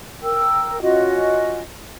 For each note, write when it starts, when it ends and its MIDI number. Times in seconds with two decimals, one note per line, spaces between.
0.22 0.78 70
0.22 0.78 79
0.22 0.78 88
0.82 1.61 61
0.82 1.61 65
0.82 1.61 66
0.82 1.61 75